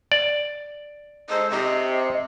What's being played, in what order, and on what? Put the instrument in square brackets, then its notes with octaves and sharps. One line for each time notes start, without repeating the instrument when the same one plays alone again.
[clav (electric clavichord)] D5
[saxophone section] G#3 A4 C5 [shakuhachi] D#5
[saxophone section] C3 [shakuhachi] D#5